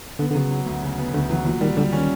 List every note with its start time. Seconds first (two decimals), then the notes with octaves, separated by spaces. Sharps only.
0.19 D3 B3
0.31 D3
0.35 C#3 F#3
0.51 F#3
0.66 D2
0.82 C#3
0.98 B3
1.13 D2 D3
1.29 E3 F#3
1.45 A#2 E3
1.61 D#3 G3
1.77 D3 G3
1.93 D#3 C#4